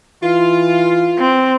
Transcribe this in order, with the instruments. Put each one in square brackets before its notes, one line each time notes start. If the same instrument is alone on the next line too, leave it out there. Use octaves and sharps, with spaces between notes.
[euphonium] E3 [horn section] F4
[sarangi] C4